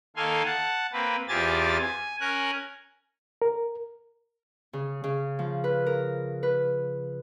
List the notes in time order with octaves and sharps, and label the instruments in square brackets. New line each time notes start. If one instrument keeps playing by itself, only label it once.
[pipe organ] D#3 A#3 A4 F5 G#5 C6
F#5 A5
A#3 C4 B4
E2 C4 F4 G4 G#5 A6
G#5
C#4 A#4 G#5 F#6
[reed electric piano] A#4
[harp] C#3
C#3
F3
B4
A#4
B4